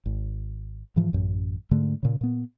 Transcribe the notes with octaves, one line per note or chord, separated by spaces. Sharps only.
G#1
G#2 E3 F3
A1 F#2
G#2 D3 A3
A#2 C#3
A#2 B3